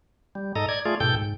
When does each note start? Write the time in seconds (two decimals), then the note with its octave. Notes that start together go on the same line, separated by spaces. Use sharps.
0.35 G3
0.55 G#2 A4 D#5 A#5
0.69 D5 G#6
0.85 A3 F4 G#4 D5
1.00 G#2 B2 A4 G5 G6
1.16 G#2